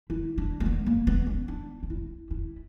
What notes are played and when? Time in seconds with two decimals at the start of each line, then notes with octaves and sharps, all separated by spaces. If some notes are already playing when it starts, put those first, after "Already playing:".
0.10 E4
0.38 D4
0.60 A#3
0.66 B3
0.86 A#3
1.07 B3
1.27 C#4
1.48 D4
1.83 D4
1.90 E4
2.31 E4